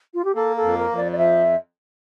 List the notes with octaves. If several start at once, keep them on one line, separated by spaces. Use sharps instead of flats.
F4
G4
A#3 A4
A4
F2
A#4
F2
D5
D5
F3 E5